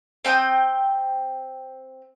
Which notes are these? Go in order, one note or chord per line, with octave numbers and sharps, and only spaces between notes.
C4 G5 D#6